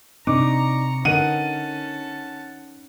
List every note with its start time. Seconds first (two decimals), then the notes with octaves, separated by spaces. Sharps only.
0.27 C3 C4 D4 D#4 A#5 C#6 D6
1.05 D3 C#4 D#4 A#4 F#5 A5 D#7